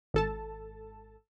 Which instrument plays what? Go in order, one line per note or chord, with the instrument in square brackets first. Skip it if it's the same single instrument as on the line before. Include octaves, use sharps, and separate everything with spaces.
[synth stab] G#1 A4 A5